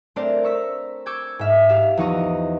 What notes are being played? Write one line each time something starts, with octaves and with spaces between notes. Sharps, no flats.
A3 C4 D4 A#4 C5 D5
A#5 C#6 E6 B6
C#6 D6 E6 G6 G#6
G#2 E5 F6
G4 F5 E7
E2 F3 D#4 A#5 C#6 D#6